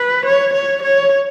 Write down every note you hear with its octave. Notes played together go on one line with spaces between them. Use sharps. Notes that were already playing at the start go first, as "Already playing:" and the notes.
Already playing: B4
C#5
C#5
C#5